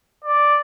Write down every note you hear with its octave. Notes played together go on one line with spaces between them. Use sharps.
D5